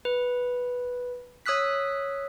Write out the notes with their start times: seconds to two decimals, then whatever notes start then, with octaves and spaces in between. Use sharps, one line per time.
0.05 B4
1.46 C#5 D#6 E6 F#6 B6